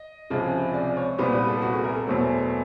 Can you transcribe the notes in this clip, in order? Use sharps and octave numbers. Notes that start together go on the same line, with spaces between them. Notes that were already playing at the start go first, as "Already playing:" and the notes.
Already playing: D#5
C#2 C3 F3 G#3
D5
C#5
C2 A#2 G3 B3 C5
B4
A4
F#4
G#4
A#4
A4
E2 B2 F#3 A3 C4